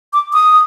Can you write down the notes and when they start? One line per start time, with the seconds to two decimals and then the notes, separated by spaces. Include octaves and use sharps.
0.13 D6
0.33 D#6